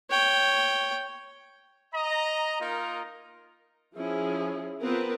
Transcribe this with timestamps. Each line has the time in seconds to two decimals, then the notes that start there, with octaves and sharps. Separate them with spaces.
0.10 C#5 G5
1.94 D#5 A#5
2.61 A#3 D#4 F4 A#4
3.96 F3 C#4 E4 G#4
4.83 B3 C4 F4 A#4 B4